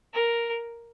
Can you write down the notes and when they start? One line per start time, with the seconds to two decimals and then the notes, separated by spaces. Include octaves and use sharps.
0.14 A#4